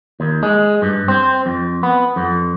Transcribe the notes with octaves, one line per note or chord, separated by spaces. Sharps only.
D#2
G#3
G2
C4
F2
B3
F2